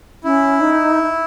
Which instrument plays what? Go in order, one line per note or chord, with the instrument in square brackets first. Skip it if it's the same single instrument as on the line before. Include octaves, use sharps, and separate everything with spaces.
[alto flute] C#4 [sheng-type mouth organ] E4
[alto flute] D#4